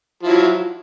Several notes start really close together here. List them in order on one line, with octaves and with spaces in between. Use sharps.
F3 E4 F#3